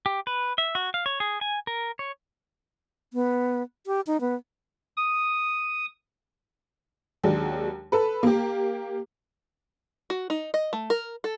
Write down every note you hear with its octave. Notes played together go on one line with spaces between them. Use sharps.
G4
B4
E5
F#4
F5
C#5
G#4
G#5
A#4
C#5
B3
G4
D#4
B3
D#6
D#2 F#3 G#3 D4
A4 B4
A#3 G4
F#4
D#4
D#5
A3
A#4
A4